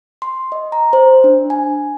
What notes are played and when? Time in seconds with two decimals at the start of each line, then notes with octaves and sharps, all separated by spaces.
0.22 C6
0.52 D#5
0.72 A#5
0.93 C5
1.24 D4
1.50 G#5